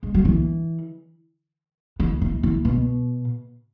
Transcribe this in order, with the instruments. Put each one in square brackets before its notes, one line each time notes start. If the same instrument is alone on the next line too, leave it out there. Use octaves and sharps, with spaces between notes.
[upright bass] G#3
F#3
E3
E3
E3
E3
B2